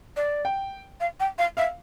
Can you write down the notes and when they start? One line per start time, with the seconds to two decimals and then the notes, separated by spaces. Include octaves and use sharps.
0.17 D5
0.45 G5
1.01 F5
1.20 G5
1.38 F5
1.57 E5 F5